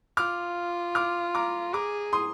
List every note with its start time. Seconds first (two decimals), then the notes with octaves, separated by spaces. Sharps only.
0.17 F4 D6 F6
0.95 D6 F6
1.35 A#5 D6
1.73 G#4 A#5 D6
2.13 C6 D#6